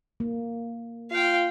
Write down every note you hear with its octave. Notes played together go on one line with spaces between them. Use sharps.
A#3
F4 F5 G5